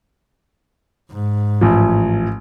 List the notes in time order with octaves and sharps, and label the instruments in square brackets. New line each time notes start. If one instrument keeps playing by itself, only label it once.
[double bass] G#2
[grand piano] A1 F3